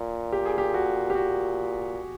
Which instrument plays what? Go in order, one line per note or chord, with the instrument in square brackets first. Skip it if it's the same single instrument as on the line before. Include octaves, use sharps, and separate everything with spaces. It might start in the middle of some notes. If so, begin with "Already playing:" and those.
Already playing: [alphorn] A#2
[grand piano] G4
G#4
G4
F#4
G4
[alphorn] A#2 [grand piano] F#4